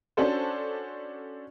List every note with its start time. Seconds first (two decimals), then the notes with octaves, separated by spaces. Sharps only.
0.17 C#4 D4 F#4 A4 C5